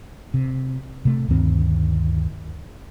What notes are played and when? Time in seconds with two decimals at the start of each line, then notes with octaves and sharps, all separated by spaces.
0.34 C3
1.05 C3 A3
1.28 D2 G2 D#3 C4